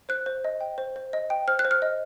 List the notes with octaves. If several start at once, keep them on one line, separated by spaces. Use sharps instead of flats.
C5 F#6
C5
D#5
G5
C5
C5
D#5
G5
C5 F6
F#6
C5
F6
D#5